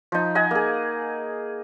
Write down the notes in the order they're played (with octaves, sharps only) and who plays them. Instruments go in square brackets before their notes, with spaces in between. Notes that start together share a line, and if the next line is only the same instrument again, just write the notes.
[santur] F3 D#4
D#5 F#5 G#5
A#3 G#4